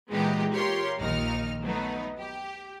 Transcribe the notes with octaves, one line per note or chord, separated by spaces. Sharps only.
A#2 E3 G#3 B3 D#4 G4
F4 G4 A#4 C#5 C6
A#1 D#2 D#4 F6
F#3 A3 B3 D#4
G4